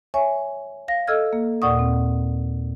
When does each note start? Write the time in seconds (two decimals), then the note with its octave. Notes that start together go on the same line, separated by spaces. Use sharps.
0.14 C#5 E5 G#5 C#6
0.88 F5 A#6
1.07 A4 D#5 E6 F6 G#6
1.33 A#3
1.62 D#2 A#2 D5 F#5 C#6 D#6
1.79 C4